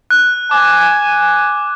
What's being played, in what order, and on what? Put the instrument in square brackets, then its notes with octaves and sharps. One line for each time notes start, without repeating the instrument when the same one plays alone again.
[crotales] F#6
[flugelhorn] G#5 [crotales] D6